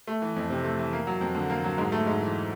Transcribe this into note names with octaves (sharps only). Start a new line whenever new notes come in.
A3
E3
F2
C3
A3
E3
A#3
F#3
F2
D3
A#3
F#3
G#2
A3
G#2
E3